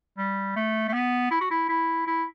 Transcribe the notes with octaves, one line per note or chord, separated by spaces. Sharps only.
G3
A3
A3
B3
E4
F#4
E4
E4
E4